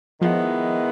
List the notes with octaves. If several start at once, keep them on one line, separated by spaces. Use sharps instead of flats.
D#3 F3 G#3 B3 E4